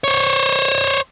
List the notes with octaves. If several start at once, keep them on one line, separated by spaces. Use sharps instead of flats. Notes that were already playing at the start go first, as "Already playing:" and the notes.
C5 C#5